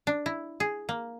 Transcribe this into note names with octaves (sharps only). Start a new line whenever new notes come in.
D4
E4
G#4
A#3